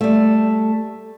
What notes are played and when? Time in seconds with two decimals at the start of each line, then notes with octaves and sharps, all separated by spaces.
0.01 G3 A3